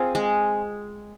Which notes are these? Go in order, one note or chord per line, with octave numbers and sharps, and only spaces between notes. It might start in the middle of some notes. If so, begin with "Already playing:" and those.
Already playing: C4 F4 G#4
G#3